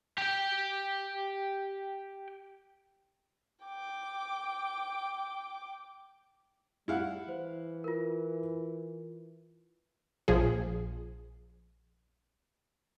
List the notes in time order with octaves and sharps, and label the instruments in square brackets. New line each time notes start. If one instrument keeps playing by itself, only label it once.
[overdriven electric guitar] G4 G5
[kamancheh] G5 D6
[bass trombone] G3 [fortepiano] E4 F5 F#5
[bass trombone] E3 [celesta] C5
[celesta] F4 A#4
[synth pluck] A#1 F3 G#4